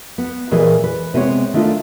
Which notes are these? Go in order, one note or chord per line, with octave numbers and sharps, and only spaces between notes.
B3
A#2 E3 G#4 A#4 D#5
B4
C3 G#3 B3 B4 C#5
D#3 A3 D4 D#4 F4